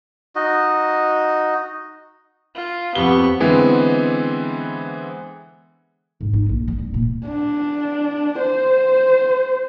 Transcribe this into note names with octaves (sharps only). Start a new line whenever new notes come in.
D#4 F#4 D#5
F4
F2 B3 G4 C#6 G7
D3 E3 G#3 B3 C4
G#2
D#4
A#1
G3
D1
A#2
D4
C5